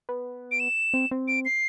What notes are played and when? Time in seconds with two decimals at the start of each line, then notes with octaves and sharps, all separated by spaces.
0.09 B3
0.51 D7
0.60 E7
0.94 C4
1.11 C4
1.28 D7
1.45 C7